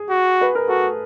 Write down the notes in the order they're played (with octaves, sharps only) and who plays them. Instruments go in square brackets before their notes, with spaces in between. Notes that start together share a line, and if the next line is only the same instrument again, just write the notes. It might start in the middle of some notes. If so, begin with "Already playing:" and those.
Already playing: [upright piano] G#4
[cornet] F#4
[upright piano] B4
A#4
[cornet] F#4 [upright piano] A4